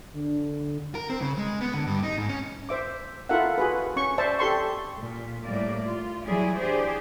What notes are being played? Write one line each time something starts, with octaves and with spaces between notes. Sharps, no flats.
D3
A#4
C4
C#3
G#3
B3
D3
G2
D#4
G#2
C#4
C5 E5 D6
E4 F4 A4 A#4 E5 F#5
F#4 G#4 B4
C#4 C#6
C5 D5 E5 A5
G4 A4 C6 C#6
A#2
A2 G3 A#3 D5
F4
E3 F#3 G3 E4 G#4 D5
D4 G4 G#4 C5 D5